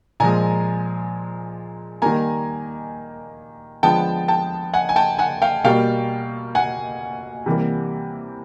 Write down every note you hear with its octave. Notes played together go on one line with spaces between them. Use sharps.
A#2 F3 G#3 G#5 A#5
D#3 G3 A#3 G#5 A#5
D3 F3 G#3 B3 G5 A5
G5 A5
F#5 G#5
G#5
G5 A5
F#5 G#5
F5 G5
B2 G3 A#3 F5 G5
F#5 G#5
C3 E3 G3 A#3